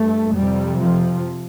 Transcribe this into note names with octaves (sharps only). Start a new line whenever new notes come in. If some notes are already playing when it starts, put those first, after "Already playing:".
Already playing: G2 A3
F2 C3 G3
F3